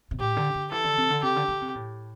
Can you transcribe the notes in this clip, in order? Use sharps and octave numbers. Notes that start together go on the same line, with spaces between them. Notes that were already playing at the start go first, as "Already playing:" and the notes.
C3
A2 G4
D3
D3
E3 A4
D3
C3
D3
C3 G4
D3
D3
C3
A2